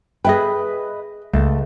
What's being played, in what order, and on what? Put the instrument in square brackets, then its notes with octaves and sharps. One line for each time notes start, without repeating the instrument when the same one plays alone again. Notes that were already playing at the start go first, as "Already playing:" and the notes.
[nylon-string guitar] G#4 E5 G5 [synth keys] B4 D#5
[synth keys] C#2 [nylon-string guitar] A3